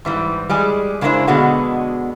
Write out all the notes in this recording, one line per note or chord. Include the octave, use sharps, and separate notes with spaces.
G#2 E3 G3
G3 G#3 G#4
C#3 G#3 A#3 D4 E4 C5
B2 D3 G#3 B3 F#4